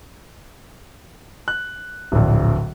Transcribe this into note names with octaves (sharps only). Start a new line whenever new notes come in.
F#6
D1 A#1